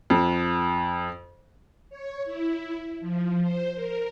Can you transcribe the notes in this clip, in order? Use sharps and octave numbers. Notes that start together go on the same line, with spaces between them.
F2
C#5
E4
F3
C5
A#4